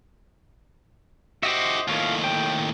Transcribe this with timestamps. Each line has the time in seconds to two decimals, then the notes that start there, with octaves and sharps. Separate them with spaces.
1.43 F#4 G4 C5 D#5 E5
1.88 D#2 A2 F4 F5 C#6
2.24 G5